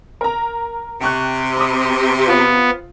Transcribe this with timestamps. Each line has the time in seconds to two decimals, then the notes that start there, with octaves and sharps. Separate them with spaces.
0.21 A#4 A#5
1.01 C3 G5 C#6 F#6
1.57 B5 D6 D#6
2.28 B3 C4 F4